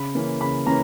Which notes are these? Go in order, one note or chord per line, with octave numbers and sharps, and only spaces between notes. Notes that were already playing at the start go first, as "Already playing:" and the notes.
Already playing: C#3 B5
E3 A#3 C#4
C#3 B5
E3 A#3 C#4 A#5